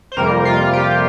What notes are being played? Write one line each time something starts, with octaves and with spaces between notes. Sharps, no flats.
C5
F2 C3 G3 A#3 A#4
F4
G4